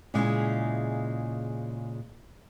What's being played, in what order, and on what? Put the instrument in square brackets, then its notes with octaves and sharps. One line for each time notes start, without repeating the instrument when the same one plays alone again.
[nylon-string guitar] A#2 C#3 G#3 E4